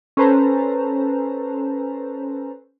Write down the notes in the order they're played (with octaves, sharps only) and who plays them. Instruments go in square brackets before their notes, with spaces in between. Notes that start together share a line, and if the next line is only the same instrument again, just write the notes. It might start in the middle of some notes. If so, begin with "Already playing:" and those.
[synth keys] C#4 A4 B4 C5 A5 A#5